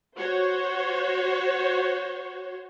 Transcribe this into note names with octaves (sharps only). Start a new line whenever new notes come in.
F#4 C5 C#5